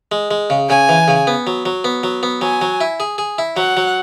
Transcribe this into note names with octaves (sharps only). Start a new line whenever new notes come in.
G#3
G#3
C#3
C#3 G#5
E3
C#3
B3
F#3
F#3
B3
F#3
B3
F#3 G#5
F#3
E4
G#4
G#4
E4
F#3 F#5
F#3